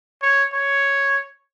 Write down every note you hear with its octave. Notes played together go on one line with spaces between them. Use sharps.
C#5
C#5